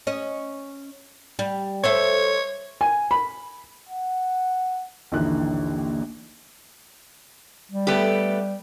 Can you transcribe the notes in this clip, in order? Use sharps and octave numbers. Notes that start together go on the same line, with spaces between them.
C#4 D#5
G3
A4 C5 C#5 E5
G#5
B5
F#5
A#1 D#2 D3 E3 D#4 F#6
G3
A3 B3 G4